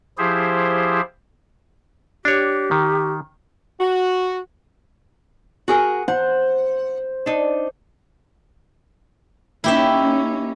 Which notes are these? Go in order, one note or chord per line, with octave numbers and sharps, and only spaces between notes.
F3 E4 G4 G#4 C5
D4 G4 C#5
D#3
F#4
F#4 G#4 A#4
C5 F#5
D4 D#4
A#3 C#4 D#4 E4 G4 E5